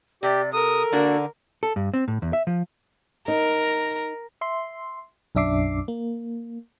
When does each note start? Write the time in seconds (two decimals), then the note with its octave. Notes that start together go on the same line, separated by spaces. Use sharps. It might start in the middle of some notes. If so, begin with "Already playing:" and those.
0.23 C3 G4 D5
0.53 A4 A#4 D#6
0.93 D3 A#3 D4 F#4
1.63 A4
1.76 G2
1.94 C4
2.08 A2
2.22 E2
2.33 E5
2.47 F3
3.28 D#4 A#4 A#5
4.41 E5 C6
5.35 B1 F#2 D4 E5 D6 C7
5.88 A#3